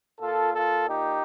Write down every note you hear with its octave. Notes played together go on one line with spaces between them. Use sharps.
A#2 F4 A4
F4 A4
D#4 G4